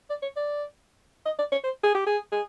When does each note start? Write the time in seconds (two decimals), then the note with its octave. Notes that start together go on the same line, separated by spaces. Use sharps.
0.10 D5
0.22 C#5
0.36 D5
1.25 D#5
1.39 D5
1.52 C#5
1.64 C5
1.83 G#4
1.95 G4
2.06 G#4
2.32 G#4